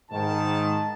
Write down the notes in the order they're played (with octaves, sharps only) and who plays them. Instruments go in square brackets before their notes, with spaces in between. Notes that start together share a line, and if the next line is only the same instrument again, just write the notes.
[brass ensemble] G#2 D#3 A5